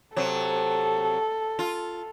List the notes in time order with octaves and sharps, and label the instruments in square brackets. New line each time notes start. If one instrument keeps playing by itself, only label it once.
[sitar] C3 F#3 [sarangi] A4
[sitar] F4